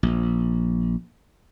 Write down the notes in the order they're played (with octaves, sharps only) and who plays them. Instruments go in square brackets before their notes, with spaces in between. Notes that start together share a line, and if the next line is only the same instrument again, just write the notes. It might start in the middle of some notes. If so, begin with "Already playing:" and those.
[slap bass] A#1